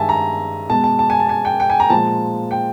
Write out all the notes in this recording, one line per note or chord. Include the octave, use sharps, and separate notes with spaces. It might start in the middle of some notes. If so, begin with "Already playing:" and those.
Already playing: G2 D#3 G#3 E5 G#5 A5
A#5
B2 G#3 A5
A5
A5
G#5
A5
G#5
G5
G5
G#5
A#5
A#2 F3 G#3 A5
G5